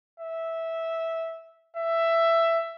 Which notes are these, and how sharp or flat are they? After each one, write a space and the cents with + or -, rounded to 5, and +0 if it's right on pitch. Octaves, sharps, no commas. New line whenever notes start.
E5 -10
E5 +10